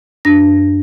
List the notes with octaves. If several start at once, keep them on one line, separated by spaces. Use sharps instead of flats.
F#2 D4 A#6